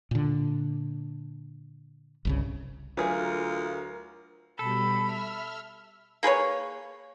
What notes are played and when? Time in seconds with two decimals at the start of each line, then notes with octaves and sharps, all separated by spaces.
0.11 A#2 D3
2.25 G1 C2 C#3
2.97 D2 E3 F#3 F4 G#4 A#4 B4
4.59 B2 G3 A4 B5
5.05 E5 E6 F6
6.23 A#3 G#4 B4 C#5